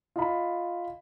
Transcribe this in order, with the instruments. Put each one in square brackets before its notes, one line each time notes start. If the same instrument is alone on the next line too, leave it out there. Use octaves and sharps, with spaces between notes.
[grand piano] F4 D#5 B5